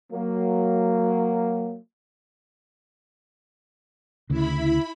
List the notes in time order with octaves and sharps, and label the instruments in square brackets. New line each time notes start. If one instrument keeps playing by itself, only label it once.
[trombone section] F#3 A#3
[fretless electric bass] D2 C#3 [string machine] E4 B5